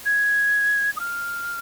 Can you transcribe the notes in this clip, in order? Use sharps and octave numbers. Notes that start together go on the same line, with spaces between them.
G#6
D#6
F6